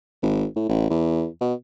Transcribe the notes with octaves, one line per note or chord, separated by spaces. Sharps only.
G#1
A2
A1
E2
B2